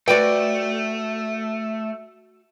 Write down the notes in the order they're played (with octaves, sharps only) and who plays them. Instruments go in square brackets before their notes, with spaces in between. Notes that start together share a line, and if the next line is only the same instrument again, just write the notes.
[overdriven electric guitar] A3 [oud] F#4 B4 [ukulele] D5 G5